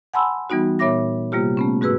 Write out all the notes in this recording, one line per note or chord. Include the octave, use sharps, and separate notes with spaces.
F#5 G#5 A5 B5 C6 E6
E3 G3 B3 D#4 F#4
A#2 B3 C#5 E5 D6 A#6
C3 G3 A#3 F4 G4
A3 B3 C#4
G#2 F#4 G#4 B4 E6